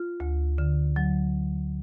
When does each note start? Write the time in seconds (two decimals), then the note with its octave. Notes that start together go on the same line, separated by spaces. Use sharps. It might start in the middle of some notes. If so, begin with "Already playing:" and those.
Already playing: F4
0.20 D2
0.58 D3
0.96 F#3